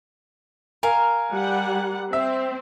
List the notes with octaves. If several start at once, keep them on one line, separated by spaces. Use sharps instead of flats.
A#4 F5 G#5
G3 F#5
C4 E5